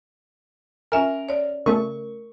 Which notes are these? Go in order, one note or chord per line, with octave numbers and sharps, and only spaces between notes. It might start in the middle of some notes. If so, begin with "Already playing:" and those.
C#4 A#4 E5 G#5
C#5 D5
C#3 A3 A#4 C#6